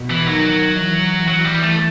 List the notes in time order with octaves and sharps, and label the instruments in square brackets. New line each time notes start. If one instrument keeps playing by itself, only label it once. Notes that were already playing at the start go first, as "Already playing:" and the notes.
Already playing: [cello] B2
[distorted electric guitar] E3
[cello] D#3 [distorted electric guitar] F#3
[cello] E3
[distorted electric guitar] F#3
G3
A3